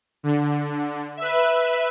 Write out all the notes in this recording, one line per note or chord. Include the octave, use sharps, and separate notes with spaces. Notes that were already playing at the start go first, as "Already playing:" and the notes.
D3
B4 E5